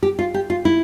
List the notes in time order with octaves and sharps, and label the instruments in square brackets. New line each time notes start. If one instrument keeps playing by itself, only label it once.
[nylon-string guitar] G4
F4
G4
F4
E4